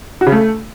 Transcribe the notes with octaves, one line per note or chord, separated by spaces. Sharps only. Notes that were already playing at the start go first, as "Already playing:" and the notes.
F#4
C#3
A3